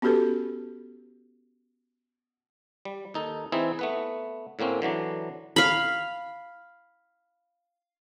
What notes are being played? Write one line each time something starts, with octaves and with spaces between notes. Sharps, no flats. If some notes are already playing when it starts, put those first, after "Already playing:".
B3 C#4 F#4 G4 A4 B4
G3
D#2 D#4 A4
E3 C4 D#4 E4 G#4
A3 B3 B4
A2 D3 A#3 C4 C#4
D3 E3 F#3 D4
F5 B5